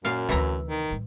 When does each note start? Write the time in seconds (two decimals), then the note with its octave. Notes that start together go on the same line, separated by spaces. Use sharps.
0.05 F#2 A#2 F5
0.29 D2 C3 E3 E4 A#5
0.69 D#3
0.90 A2 G3